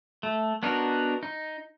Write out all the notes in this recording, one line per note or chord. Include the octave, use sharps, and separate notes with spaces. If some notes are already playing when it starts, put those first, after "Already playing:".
A3
B3 D4 D#4 F#4 A#4
D#4